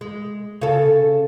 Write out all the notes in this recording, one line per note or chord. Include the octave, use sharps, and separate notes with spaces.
G#3
C#3 A4